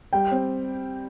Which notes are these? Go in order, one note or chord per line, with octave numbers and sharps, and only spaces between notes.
G3 G5
C4